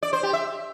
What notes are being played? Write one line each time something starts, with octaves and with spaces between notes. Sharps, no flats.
D5
C5
G4
E5